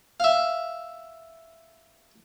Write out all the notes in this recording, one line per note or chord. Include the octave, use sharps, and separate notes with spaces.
E5 F5